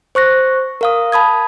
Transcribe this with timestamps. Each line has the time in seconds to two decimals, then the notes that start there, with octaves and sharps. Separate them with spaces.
0.15 C5 C#6 F#6 A#6
0.81 A#4 F5 D#6
1.12 A5 B5 D#6 G#6